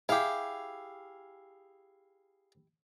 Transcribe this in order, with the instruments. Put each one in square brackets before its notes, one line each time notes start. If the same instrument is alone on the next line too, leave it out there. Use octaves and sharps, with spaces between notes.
[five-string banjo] E4 G4 [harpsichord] G#4 F5